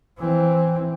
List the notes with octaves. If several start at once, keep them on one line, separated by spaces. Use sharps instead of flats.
E3 C4